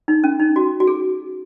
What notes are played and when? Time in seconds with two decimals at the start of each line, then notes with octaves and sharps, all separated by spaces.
0.08 D#4
0.24 C#4
0.40 D#4
0.56 F#4
0.80 F#4
0.87 G#4